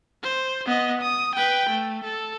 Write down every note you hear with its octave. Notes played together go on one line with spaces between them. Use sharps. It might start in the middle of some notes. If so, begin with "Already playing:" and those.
C5
B3 D#5
D#6
B4 G5
A3
A4